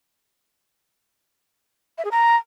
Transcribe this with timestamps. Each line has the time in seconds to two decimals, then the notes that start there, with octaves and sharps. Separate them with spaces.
1.98 E5
2.05 G#4
2.11 A#5